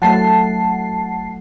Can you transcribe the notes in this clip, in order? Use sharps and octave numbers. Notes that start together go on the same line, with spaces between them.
F#3 A3 F#5 A5 C7